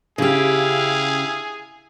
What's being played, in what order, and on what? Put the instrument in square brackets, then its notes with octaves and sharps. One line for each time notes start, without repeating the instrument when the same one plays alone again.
[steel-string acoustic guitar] C#3 G4 [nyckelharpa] E4 F5 [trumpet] G#4